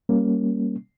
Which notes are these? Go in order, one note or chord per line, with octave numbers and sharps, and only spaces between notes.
G3 A#3 C#4